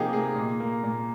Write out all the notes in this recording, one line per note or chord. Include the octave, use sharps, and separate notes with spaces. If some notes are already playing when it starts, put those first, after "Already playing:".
Already playing: C3 F3 A#3 D#4 G4 G#4
A#3 G#4
A#2
A#3
A#2